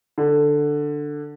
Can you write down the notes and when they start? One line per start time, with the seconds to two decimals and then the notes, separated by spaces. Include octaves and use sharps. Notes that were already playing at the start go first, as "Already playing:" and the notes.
0.18 D3